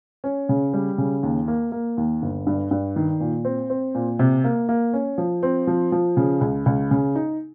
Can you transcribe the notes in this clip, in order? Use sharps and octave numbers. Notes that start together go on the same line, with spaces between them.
C#4
C#3
G3
C#3
D#2
A#3
A#3
D#2
G1
G2
G2
D#3
A#2
C4
C4
A#2
C3
A#3
A#3
C#4
F3
C4
F3
F3
C#3
C#2
C#2
C#3
D#4